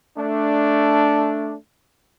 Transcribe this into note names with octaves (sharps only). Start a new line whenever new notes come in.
A3 D4